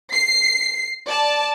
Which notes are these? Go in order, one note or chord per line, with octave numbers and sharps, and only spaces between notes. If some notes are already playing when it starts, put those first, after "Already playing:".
C7
D5 A5